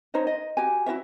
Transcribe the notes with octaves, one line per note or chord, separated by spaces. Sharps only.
D#4 C5 C#5 D#5
D#5
F#4 G4 G#5
E4 F#4 C#5 E5